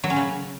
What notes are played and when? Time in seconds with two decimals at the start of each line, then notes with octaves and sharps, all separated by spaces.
0.04 F#3
0.10 C#4
0.16 C#3